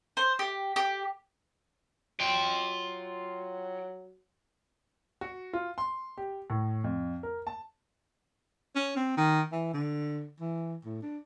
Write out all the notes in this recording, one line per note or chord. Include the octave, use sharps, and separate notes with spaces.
C5
G4
G4
F#3 F4 G5
F#4
F4
C6
G4
A2
F2
A#4
A5
C#4
C4
D#3
E3
D3
E3
A2
D4